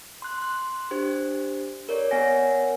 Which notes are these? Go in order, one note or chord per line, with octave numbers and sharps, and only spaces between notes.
C6 F#6
C6 F#6
D4 G4 C5
A#4 C#5 D5
B3 A#4 C#5 F#5 G#5 A#6